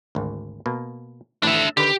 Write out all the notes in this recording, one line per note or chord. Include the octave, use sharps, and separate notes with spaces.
G#1 D2
B2 A#3
A1 A2 D4 E5
D3 D#3 G4 B4